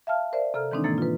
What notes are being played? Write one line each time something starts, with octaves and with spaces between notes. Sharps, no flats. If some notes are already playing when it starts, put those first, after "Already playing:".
E5 F5 A5 F6
A#4 C5 D5 E5
C3 A4 A#5 F6
D#3 E3 G#3 C4 D4 D#4
A2 C3 E3 A#3 A6
F4 B4